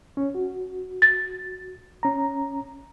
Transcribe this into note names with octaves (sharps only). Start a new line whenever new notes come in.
C#4 C#5
F#4
A6
C#4 A#5